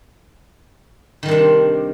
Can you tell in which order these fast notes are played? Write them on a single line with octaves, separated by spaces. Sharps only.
D#3 G3 C3 D4